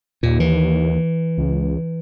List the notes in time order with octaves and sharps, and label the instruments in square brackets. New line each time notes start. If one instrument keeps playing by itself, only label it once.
[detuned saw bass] D#2 [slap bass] A#2
[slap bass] E3
[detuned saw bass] C#2